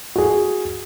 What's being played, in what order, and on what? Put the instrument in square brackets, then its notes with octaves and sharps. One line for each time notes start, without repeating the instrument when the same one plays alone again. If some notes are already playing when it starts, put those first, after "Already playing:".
[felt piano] F#4 G#4